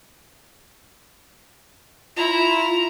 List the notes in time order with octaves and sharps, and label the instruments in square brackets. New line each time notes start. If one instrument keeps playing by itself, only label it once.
[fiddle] E4 A#5 [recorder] F4